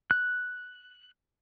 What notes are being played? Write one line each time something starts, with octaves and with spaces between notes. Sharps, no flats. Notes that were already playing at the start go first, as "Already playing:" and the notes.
F#6